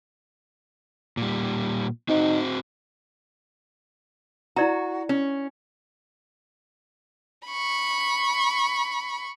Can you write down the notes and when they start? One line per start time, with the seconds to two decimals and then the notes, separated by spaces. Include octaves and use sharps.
1.17 A#2 G3
2.09 C4 D#4 F#4 C5
4.56 E4 F#4 D5 A#5
5.09 C#4
7.48 B5 C#6